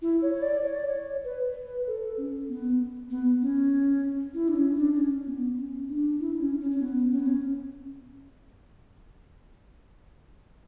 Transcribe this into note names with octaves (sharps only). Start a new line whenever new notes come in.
E4
C#5
C#5
D5
C#5
D5
C#5
B4
B4
A4
C#4
B3
B3
C#4
E4
D4
C#4
D4
C#4
B3
C#4
D4
E4
D4
C#4
C#4
C#4
B3
C#4
B3
C#4